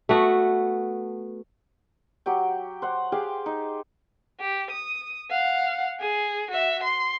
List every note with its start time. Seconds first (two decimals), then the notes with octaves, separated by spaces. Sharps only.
0.09 A3 B3 F#4
2.26 F#3 G4 G5
2.82 C5 F#5
3.12 G4 G#4 F5 G5
3.46 D#4
4.40 G4
4.70 D#6
5.30 F5 F#5
6.00 G#4
6.51 F#4 E5
6.83 C6